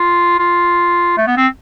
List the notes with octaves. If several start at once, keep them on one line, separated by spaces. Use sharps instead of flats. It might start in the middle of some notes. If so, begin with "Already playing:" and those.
Already playing: F4
F4
A3
B3
C4